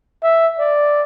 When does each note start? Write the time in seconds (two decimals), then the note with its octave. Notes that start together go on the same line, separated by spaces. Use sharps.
0.23 E5
0.59 D5